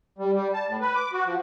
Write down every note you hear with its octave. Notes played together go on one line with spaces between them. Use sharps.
G3
G3
A5
A2
B4
D6
F#4
F3